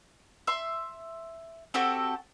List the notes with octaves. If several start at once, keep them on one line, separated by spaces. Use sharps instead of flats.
E5 C6
C4 F#4 G4 A4